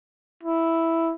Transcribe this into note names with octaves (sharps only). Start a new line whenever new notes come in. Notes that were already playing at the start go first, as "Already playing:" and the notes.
E4